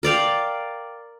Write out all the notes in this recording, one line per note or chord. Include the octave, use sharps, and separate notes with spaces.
A#4 D5 F5 G5